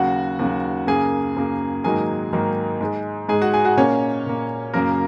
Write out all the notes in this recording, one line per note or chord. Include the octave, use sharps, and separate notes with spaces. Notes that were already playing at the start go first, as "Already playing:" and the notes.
Already playing: D#2 C#3 F#3 F#4 F#5
D#2 C#3 F#3
F#2 C#3 A#3 G#4 G#5
F#2 C#3 A#3
G#2 D#3 F#3 A#3 G#4 G#5
G#2 D#3 F#3 A#3
G#2 G#3
G#2 G#3 G#4 G#5
F#4 F#5
G#4 G#5
F#4 F#5
A#2 A#3 C#4 C#5
A#2 A#3
F#2 C#3 F#3 A#3 A#4